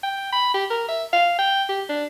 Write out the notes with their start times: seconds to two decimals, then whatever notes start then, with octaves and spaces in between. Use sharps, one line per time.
0.04 G5
0.33 B5
0.54 G4
0.70 A#4
0.89 E5
1.13 F5
1.39 G5
1.69 G4
1.90 D4